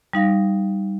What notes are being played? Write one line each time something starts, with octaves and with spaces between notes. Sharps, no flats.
G3 D#4 F5 A#6